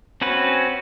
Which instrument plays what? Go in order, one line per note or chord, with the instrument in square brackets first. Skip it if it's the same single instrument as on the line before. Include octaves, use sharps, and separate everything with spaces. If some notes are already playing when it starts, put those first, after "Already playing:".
[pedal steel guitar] C4 C#4 F#4 B4